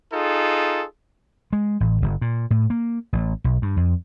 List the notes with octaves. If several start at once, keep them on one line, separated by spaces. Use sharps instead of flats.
D#4 F4 G#4 A4
G#3
A1
G1
A#2
A2
A#3
A1
B1
G2
F2